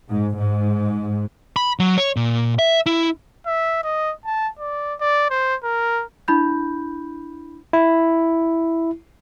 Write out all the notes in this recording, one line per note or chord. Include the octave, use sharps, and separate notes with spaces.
G#2
G#2
B5
F#3
C#5
A#2
E5
E4
E5
D#5
A5
D5
D5
C5
A#4
D4 E4 B5 G6
E4